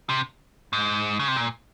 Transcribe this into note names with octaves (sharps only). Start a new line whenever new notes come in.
C3
G#2
C#3
C3
A#2